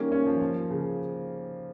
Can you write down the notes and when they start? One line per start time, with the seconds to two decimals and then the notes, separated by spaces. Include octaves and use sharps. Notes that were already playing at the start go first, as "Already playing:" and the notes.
Already playing: D#3 G3 A#3 C#4
0.12 C#4
0.26 F3
0.41 F3
0.70 C#3